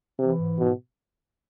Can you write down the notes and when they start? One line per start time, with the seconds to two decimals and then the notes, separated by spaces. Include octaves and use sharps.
0.19 C3 E3
0.39 G#2
0.59 G#2 B2